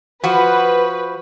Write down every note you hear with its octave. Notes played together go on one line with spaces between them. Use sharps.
F3 F#4 B4